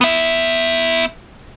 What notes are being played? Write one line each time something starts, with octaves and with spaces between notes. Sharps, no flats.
B3 E5